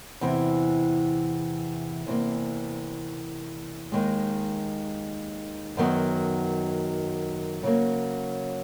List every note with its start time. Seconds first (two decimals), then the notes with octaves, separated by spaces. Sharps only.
0.21 E2 C3 E3
2.07 E2 C3 E3 G3 A#3
3.92 D#2 D#3 G#3
5.77 F#2 D#3 F#3 B3
7.63 C#3 F#3 A#3